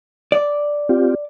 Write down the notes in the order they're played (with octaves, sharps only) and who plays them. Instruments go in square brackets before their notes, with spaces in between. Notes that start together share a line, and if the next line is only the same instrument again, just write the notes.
[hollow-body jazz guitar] D5
[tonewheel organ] C4 F4 G4